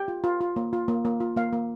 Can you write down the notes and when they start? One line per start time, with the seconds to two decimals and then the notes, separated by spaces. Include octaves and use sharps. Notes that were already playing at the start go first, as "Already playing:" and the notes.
Already playing: G4 G5
0.08 F4
0.24 F4
0.41 F4
0.56 A#3
0.73 F4
0.88 A#3
1.05 A#3
1.20 F4
1.37 A#3 F5
1.53 A#3